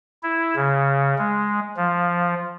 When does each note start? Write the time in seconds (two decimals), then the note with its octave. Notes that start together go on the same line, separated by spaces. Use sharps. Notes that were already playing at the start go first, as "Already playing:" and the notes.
0.23 E4
0.56 C#3
1.19 G#3
1.77 F3